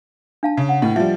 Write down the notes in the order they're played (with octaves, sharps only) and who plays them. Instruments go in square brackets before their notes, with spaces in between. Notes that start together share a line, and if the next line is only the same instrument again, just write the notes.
[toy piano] D4 F5 A5
[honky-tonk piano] C#3
[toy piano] F#5
[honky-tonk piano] A2 [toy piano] B4 D#5
[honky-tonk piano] F3 G3 [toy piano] E5